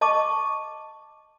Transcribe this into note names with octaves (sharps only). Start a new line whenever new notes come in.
D#5 A5 C#6 D6